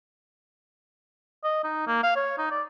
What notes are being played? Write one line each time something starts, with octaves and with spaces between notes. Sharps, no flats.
D#5
D#4
A#3
F5
C#5
D#4
D5